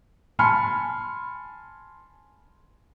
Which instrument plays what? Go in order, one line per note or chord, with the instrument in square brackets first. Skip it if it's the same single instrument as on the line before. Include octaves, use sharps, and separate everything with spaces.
[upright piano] G#5 A5 B5 C6 F6 C#7